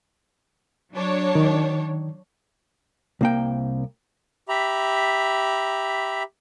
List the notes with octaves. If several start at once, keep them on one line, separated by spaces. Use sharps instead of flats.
F#3 D4 C#5
D#3
C2 A#3 G5
G4 E5 A#5 B5